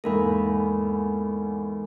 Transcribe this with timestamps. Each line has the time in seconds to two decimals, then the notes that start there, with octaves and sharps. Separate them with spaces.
0.04 E2 G#2 A#3 A4 A#4 B5